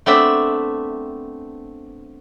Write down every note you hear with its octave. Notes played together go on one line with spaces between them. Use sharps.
A3 B3 C4 D4 D5 E5